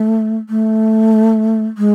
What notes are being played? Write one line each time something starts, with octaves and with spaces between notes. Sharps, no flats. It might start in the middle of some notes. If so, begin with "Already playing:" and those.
Already playing: A3
A3
G#3